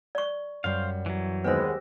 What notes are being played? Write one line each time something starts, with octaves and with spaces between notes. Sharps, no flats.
D5 C#6
F#2 G3 C5 F5
E3 F#3
D#2 G#3 B3 G4 B4 C5 E6 A#6